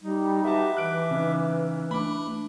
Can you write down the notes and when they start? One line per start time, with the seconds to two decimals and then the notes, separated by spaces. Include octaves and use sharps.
0.02 G3 D#4
0.45 F#4 G4 B4 E5 A5 D6
0.77 E3 B4 F#6 D7
1.10 C#3 D#4
1.91 A3 D4 B5 D6